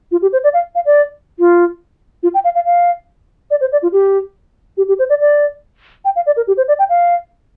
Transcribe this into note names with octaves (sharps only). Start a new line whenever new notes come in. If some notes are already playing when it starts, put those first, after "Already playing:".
F4
G4
C5
D5
F5
F5
D5
F4
F4
G5
F5
F5
F5
D5
C5
D5
F4
G4
G4
G4
C5
D5
D5
G5
F5
D5
A#4
G4
C5
D5
G5
F5